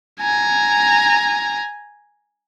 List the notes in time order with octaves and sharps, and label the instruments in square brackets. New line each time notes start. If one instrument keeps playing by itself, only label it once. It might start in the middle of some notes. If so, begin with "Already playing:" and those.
[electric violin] G#5 A#5